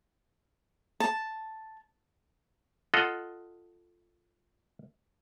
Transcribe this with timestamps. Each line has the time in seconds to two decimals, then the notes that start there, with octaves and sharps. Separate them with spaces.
1.00 A5
2.94 F4 A4 D#5 F#5